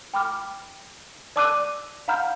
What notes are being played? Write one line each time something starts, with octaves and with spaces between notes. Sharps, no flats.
G5 B5 D6 F6
D5 A5 D6 E6 F#6 D#7
F5 F#5 A#5 B5 F6 G6